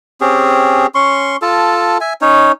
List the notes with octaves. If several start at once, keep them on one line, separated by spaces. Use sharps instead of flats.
C4 C#4 G4 G#4
C#4 C6 C#6
F4 A4 A5
E5 G#5
C#4 D#4 C#5